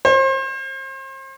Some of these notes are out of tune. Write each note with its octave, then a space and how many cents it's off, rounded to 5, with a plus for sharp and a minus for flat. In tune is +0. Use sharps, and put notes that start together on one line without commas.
C5 +35